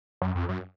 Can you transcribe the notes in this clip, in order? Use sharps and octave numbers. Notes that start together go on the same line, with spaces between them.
F#2
F2
F#2